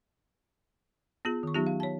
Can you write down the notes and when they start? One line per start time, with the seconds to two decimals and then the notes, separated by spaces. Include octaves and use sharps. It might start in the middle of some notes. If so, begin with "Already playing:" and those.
1.25 B3 F4 G#4
1.43 D#3 C#6
1.54 F#3 B3 D#4 F4 G4
1.67 F5
1.80 C#5 A5